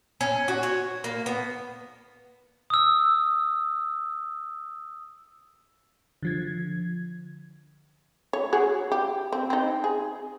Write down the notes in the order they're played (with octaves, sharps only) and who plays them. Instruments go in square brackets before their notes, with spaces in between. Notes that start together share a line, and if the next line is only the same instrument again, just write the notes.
[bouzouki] C#4
F#4
C#5
A#3
B3
[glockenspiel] D#6 E6
[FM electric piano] D3 F3 G#6
[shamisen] C#5
F#4 G#4 C#5
G4
C4
C4 D#4
G#4